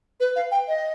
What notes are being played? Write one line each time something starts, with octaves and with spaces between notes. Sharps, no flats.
B4
F5
G5
D#5